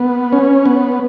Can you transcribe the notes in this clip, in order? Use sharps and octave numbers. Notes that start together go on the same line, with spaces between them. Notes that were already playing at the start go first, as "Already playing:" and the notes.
Already playing: B3
C#4
B3